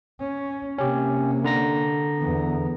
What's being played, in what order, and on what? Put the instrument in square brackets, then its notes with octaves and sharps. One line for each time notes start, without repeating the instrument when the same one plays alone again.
[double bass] C#4
[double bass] C3 A#3 [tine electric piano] C#4 G4
[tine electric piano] D3 A#5 A#6
[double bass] E2 B3